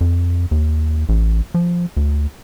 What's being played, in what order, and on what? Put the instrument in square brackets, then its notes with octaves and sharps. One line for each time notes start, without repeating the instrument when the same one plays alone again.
[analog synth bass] F2
D#2
A1
F3
D2